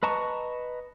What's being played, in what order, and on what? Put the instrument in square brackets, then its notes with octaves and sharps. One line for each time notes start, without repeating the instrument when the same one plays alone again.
[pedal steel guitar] B4 D#5 A5 A#5 C#6